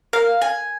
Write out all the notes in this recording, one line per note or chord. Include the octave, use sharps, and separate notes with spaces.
A#4 F5
G#5